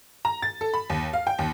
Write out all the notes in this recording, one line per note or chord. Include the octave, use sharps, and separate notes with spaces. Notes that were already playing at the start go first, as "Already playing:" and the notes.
A#5
A6
A4
B5
D#2
F5
G5
D#2